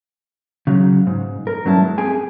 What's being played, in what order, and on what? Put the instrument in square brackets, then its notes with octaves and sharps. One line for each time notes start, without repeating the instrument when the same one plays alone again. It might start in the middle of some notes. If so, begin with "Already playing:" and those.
[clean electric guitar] C#3 F#3
G#2
A#4
G2 F#3 C#4 E4 A5
G#3
C4 G4 G#4 G5 G#5